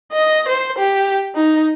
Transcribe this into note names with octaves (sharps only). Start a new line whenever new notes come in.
D#5
C5
G4
D#4